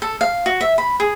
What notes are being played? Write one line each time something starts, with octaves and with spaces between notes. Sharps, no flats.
A4
F5
F#4
E5
B5
G#4